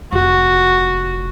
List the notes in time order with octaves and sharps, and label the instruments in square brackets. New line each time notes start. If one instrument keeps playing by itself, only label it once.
[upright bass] F1 [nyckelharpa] F#4